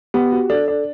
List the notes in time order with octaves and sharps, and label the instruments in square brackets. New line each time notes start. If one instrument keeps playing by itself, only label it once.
[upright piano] B3 [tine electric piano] G4
[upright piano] F#4
[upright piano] D4 [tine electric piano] A4
[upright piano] D4